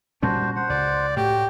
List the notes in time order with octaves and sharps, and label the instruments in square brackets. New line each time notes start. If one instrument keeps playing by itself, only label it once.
[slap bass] A#2 G3 C#4 [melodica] D4 F#4 C5
[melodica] C5 F#5
[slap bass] C#2 [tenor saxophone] D5
[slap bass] A2 [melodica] F#4 [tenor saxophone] G4